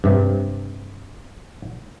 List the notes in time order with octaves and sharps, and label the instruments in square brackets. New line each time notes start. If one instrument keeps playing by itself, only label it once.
[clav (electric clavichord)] G2 C3